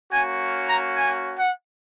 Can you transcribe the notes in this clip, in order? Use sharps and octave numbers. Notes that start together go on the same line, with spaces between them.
A#3 C#4 F#4 G#5
A#5
G#5
F#5